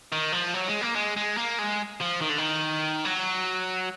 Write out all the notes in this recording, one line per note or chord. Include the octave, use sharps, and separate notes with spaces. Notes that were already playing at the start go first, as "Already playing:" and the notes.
D#3
F3
F#3
G#3
A#3
G#3
G#3
A#3
G#3
F3
D#3
D3
D#3
F#3